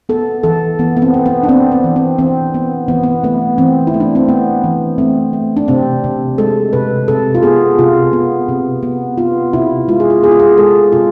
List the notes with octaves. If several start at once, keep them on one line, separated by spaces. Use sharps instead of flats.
B3 A4
E3 A4
E3 B3
B3
C4
B3
B3
D4
B3 C4
C4
E3
C4
E3 C4
B3
E3 B3
B3
A3 B3
E3 C4
E4
A3
D4
C4
A3 B3
E3
A3 C4
A3
D4
C3 C4
C3
G#3 A4
C3 B4
C3 A4
F4
B3 G#4
C3 F4
B3
C3
B3
B3 F4
C3 E4
G#3 F4
G#4
F4
B3 G#4
F4
G#4
G#3 A4
C3 F4